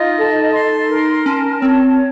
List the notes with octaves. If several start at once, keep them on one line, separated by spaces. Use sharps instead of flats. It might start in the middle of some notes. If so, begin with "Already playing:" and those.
Already playing: D#4 F4 D#5
A4
C6
A#4
C#4 A5
C4 C#5